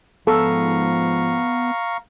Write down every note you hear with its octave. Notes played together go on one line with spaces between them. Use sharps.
G#2 F3 B3 A4 F5 A#5 C#6